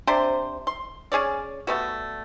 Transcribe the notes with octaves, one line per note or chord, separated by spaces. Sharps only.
C3 D4 C5 C6
C6
C#4 G#4 C#5 D5
G3 A3 B3 F#4